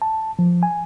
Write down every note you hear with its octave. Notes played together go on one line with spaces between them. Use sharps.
A5
F3
G#5